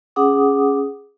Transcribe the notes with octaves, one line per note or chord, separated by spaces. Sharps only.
C#4 G#4 F#5 D6 D#6